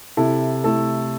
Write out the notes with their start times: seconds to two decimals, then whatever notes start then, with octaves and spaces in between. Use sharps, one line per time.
0.17 C3 E4 A4
0.64 A3 E4 A4